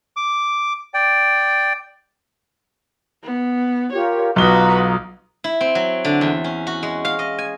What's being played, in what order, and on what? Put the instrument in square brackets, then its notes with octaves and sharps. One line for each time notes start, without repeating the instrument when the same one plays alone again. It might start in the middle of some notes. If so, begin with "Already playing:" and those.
[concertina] D6
D5 G5
[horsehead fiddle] B3
[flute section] F4 G4 A#4 [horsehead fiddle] C#5
[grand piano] B1 G7 [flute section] F4 A#5 D#6 [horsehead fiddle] F#4 B4
[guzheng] E4
C4
F#3
D3
E2
C#4
F#4
G#3
F5
D#5
G#5